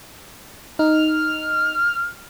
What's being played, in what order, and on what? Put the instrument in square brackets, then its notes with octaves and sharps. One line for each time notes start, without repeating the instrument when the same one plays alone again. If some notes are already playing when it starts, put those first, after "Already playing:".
[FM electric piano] D#4 [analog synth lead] F6